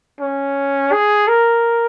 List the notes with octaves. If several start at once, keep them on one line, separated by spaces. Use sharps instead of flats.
C#4
G#4
A#4